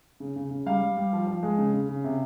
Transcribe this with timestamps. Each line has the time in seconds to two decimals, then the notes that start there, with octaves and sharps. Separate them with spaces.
0.20 C#3
0.36 C#3
0.51 C#3
0.66 G3 F5
0.82 G3
0.97 G3
1.13 F3
1.27 F3
1.43 G#3
1.58 C#3
1.73 C#3
1.89 C#3
2.04 C3